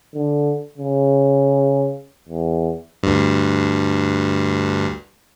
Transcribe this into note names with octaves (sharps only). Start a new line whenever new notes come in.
D3
C#3
E2
D2 G2